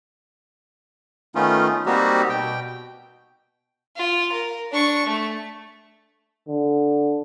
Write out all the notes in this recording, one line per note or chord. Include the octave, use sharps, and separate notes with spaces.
D#3 A3 B3 C#4 D#4 F4
G3 A#3 C4 D#4 F#4 G4
B2 G5
F4
A#4
D4 C#6
A3
D3